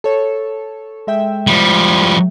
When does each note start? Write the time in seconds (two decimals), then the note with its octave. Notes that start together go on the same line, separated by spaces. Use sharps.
0.04 A4 C#5
1.07 G#3 E5 G5
1.47 F3 G3